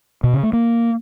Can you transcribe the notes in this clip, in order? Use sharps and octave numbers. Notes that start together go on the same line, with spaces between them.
B2
C#3
A3
A#3